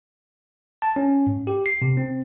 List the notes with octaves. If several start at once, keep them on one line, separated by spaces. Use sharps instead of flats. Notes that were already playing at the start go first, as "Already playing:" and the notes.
A5
C#4
G#2
G4
C7
C3
C4